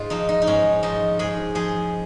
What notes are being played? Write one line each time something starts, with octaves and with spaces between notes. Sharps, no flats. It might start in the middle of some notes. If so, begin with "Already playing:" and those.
Already playing: G#2 F4
F3 D#4
D#4
D#4
G#2 C#4
F3 D#4
G#2 G#4
F3 G#4